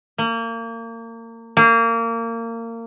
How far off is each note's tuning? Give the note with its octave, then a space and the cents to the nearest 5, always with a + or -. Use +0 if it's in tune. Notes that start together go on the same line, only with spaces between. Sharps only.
A#3 -30
A#3 -25